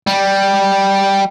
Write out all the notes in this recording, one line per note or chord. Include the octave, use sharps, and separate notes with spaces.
G3